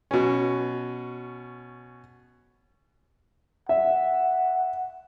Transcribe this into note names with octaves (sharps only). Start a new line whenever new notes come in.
B2 C#4
E5 F#5